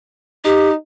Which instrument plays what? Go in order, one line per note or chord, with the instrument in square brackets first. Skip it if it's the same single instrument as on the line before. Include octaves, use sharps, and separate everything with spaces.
[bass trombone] D#4 [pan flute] G4